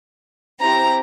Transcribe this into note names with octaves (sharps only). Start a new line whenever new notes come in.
C4 E4 G4 A#5